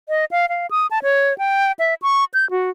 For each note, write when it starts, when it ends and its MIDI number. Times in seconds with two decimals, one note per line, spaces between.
0.09 0.25 75
0.31 0.49 77
0.49 0.67 77
0.71 0.87 87
0.91 0.99 81
1.03 1.36 73
1.38 1.72 79
1.79 1.94 76
2.02 2.24 85
2.34 2.49 91
2.51 2.70 66